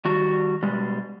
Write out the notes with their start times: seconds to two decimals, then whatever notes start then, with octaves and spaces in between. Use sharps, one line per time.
0.05 D#3 G3 F#4
0.63 B2 G3 G#3